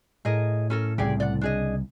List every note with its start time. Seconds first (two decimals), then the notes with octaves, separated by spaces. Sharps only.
0.25 A2 G#4 A#4 D#5
0.70 C#4 A4 A#4
0.98 C2 C#3 G4 G#4 D5
1.20 D5 F#5
1.41 D4 G#4 D#5